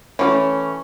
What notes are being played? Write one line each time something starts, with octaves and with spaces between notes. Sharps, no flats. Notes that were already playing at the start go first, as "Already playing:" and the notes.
E3 G3 A3 C#4